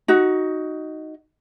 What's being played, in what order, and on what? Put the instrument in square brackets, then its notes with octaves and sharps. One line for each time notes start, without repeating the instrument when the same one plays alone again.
[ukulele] D#4 F#4